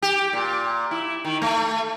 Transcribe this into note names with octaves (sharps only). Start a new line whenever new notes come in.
G4
A#2
E4
D#3
A3